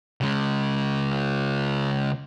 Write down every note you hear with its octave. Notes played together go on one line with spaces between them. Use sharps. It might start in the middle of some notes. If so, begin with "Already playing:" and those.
C#3 G#3